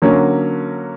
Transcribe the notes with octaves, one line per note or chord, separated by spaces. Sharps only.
D3 F#3 A#3 C#4